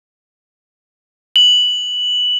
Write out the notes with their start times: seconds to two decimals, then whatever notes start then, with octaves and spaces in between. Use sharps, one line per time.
1.36 F#7